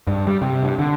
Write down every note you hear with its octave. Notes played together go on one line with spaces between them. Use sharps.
G2
G3
C3
G2
D3